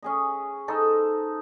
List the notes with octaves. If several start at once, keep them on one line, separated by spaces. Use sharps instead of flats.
C#4 G#4 D#5
D#4 A4 C5 D#5